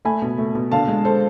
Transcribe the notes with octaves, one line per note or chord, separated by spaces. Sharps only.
A3 G#5 B5
B2
A3
B2
D3 F5 A5
G#3
A4 C5